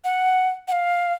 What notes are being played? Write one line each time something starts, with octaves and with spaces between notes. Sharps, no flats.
F#5
F#5
F5